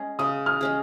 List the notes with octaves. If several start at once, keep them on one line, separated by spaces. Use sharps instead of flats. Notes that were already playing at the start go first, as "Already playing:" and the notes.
Already playing: G#3 C#4 G#4
C#3 D#6
F6
G#3 C#4 G#4